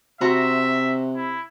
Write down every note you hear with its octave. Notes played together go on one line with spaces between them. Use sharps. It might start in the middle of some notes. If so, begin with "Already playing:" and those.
C3 F#4 C5 E5 A#5
E4